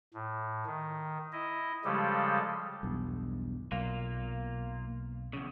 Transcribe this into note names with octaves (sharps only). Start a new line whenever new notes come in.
A2
D#3
E4 D#5
C#3 F3 G3 G#3 G4 A4
B1 E2 G2
B1 A#3 F4
E2 C#3